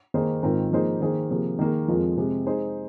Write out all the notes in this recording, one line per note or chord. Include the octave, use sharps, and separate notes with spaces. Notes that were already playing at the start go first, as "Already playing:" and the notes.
D#3 A#3 D#4 G#4 C5
G#2 D#3 C4 F4 A#4
F3 A#3 D#4 G#4 C5
D#3 A#3 G#4 C5
C3 F3 A#3 G#4
D#3 A#3 G#4
F2 F3 G#3 F4 A#4
C3 G#3 C4
G#3 D#4 G#4 C5